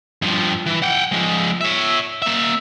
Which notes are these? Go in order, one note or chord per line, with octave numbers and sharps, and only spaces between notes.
G2 F3
E3
F#5 G5
F3 G#3
C#5 E5
A#3 E5